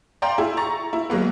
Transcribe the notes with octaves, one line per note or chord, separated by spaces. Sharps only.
D5 F5 G5 A#5 C6
E4 G#4
A#5 C#6 A6
E4
F#3 G#3 A#3 B3